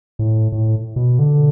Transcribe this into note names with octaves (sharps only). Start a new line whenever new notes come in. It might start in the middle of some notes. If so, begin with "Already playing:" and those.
A2
A2
B2
D3